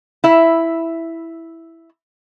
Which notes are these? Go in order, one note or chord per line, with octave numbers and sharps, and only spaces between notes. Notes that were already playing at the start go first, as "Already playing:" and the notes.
E4 E5